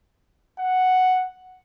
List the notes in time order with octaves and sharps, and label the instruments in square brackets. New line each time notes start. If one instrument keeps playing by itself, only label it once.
[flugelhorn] F#5